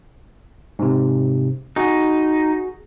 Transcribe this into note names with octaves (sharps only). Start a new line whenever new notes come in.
G#2 C3
D#4 F#4 G#4